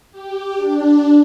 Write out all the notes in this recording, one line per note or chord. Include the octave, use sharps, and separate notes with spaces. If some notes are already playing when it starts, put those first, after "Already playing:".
G4
D4